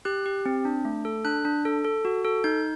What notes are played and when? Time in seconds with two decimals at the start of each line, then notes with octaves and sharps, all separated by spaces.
0.05 G4 F#6
0.26 G4
0.46 C4
0.65 D4
0.85 A3
1.05 A4
1.25 D4 F#6
1.45 D4
1.65 A4
1.84 A4
2.05 F#4
2.24 A4
2.44 D#4 G6